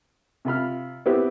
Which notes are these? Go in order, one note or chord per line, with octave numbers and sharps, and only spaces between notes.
C3 F4 B5 F6
B3 C4 E4 G4 B4